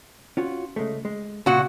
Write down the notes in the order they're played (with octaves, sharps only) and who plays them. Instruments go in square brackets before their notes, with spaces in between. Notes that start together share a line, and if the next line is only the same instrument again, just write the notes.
[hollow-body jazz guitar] C#4 F4 F#4
C#3 G#3 A3
G#3
[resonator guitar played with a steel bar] A#2 F#4 [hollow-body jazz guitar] C#3